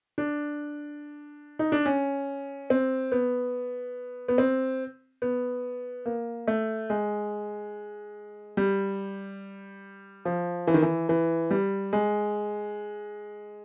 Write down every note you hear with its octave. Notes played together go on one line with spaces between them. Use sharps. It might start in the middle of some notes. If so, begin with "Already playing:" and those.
D4
D#4
D4
C#4
C4
B3
B3
C4
B3
A#3
A3
G#3
G3
F3
E3
D#3
E3
E3
G3
G#3